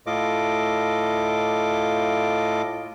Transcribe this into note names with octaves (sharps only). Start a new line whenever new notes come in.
A2 F4 A4 D#5 D6